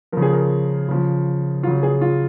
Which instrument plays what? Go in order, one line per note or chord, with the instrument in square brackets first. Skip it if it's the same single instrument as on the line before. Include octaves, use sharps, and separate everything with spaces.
[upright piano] C#3 F3 A#4
G#4
A#4
C#3 F3
F#3 F4
C#3
G#4
F4